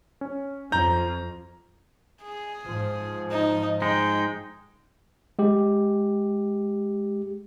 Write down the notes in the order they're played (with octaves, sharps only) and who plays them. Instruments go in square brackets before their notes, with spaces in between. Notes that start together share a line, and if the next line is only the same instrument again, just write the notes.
[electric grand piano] C#4
[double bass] F2 [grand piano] A#5 [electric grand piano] G6
[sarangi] G#4
[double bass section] G#2 F3
[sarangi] D#4
[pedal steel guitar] G#3 D#4 [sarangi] G5
[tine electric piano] G#3 G4